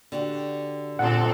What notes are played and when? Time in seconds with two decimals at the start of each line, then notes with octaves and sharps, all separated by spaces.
0.12 D3 F#4 G4
0.99 A#2 C4 A4 F#5